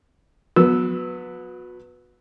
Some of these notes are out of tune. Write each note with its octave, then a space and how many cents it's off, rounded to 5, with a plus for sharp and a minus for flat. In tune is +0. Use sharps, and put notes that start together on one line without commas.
F#3 -30 B3 +0 E6 -10